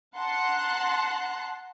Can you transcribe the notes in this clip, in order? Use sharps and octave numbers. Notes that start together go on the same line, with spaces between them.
F#5 A5 A#5 C6 F#6